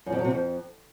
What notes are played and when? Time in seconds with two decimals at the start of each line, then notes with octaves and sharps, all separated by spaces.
0.06 F#2
0.12 F2
0.18 F#3
0.25 C3
0.31 F2